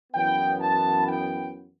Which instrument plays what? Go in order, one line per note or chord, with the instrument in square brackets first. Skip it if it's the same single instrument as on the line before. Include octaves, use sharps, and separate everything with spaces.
[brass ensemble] F#2 E3 B3 G5
A5
G5